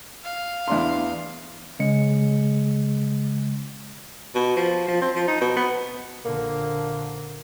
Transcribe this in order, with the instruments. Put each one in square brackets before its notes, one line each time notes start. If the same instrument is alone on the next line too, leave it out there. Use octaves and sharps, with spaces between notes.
[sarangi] F5
[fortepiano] E2 D4 C6
[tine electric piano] C#3 G#3 C#7
[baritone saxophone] B2
F3
F3
C4
F3
D#4
B2
B3
[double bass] A#1 D3 [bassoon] A#3